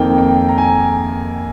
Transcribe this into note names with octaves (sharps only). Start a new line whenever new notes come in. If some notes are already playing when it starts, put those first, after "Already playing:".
Already playing: F2 D#3 A#3 G5
G5
A#5
G#5